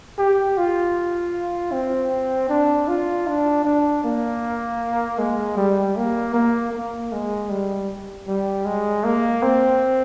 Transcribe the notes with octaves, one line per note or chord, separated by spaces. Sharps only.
G4
F4
C4
D4
F4
D4
D4
A#3
G#3
G3
A#3
A#3
A#3
G#3
G3
G3
G#3
A#3
C4